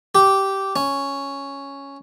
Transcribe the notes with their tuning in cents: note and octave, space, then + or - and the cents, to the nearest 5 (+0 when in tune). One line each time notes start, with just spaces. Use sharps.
G4 -10
C#4 +0